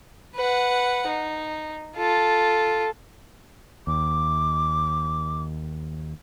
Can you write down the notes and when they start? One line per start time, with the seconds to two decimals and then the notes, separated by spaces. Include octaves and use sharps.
0.35 B4 F#5
1.07 D#4
1.97 F4 A4
3.87 D#2 D6